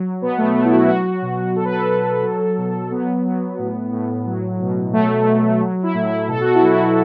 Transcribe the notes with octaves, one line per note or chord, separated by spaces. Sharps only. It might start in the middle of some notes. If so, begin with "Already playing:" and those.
Already playing: F#3
B2 B3
A3
F#3 A3
E4
F#4
F#3 F#4
B2
F#3 A4
B4
A4
F#3
F#3
B2
F#3 B3
F#3
A2
A2
F#3
B2
F#3 A3
F#3
F#3
E4
A2
E4
B2 A4
F#4
E4
F#3
F#4